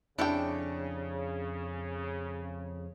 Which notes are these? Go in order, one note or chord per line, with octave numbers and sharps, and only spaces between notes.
F2 C#3 D4 E4 G4 A4 G5